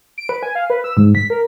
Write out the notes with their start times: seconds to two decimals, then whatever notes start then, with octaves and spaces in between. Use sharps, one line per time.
0.18 D7
0.29 B4
0.43 G#5
0.55 F5
0.70 B4
0.84 E6
0.97 G#2
1.15 B6
1.30 A#4